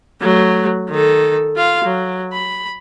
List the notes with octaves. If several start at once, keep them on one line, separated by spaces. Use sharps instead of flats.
F#3 A3
D#3 A4
F4 F5
F#3
B5